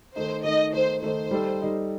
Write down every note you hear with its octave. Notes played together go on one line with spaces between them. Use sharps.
D#3 A3 D#4 C5
D#3 A3 D#4 D#5
D#3 A3 D#4 C5
D#3 A3 D#4 C5
G3 D#4 A4
G3 D#4 A4